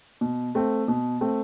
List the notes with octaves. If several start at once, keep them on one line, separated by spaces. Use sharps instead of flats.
B2
A3 C4
B2
A3 C4